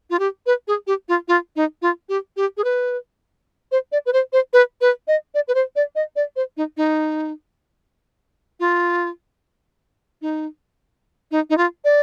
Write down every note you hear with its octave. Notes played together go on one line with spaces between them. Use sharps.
F4
G4
B4
G#4
G4
F4
F4
D#4
F4
G4
G4
G#4
B4
C5
D5
B4
C5
C5
B4
B4
D#5
D5
B4
C5
D5
D#5
D5
C5
D#4
D#4
F4
D#4
D#4
D#4
F4
D5